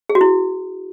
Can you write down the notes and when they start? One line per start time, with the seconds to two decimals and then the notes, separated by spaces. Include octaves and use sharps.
0.09 G#4
0.15 F#4
0.21 E4